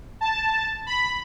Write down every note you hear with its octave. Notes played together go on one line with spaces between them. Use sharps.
A5
B5